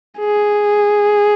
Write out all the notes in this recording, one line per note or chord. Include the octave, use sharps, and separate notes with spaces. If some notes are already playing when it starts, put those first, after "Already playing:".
G#4